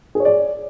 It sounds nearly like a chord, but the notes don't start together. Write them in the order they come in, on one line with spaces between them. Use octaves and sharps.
G#4 C#5 D5